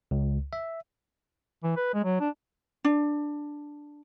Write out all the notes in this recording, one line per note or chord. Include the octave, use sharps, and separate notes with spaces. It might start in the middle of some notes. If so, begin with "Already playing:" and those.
C#2
E5
E3
B4
G#3
F#3
D4
D4